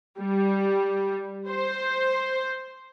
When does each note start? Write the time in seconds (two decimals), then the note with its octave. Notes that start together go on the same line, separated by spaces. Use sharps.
0.19 G3
1.48 C5